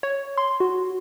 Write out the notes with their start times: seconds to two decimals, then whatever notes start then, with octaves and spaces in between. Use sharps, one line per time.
0.03 C#5
0.38 C6
0.60 F#4